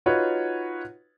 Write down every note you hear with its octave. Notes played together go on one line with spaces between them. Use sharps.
D#4 F4 F#4 B4 C#5